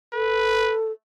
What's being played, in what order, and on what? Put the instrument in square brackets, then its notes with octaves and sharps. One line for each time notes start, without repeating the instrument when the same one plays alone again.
[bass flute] A4 [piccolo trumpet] B4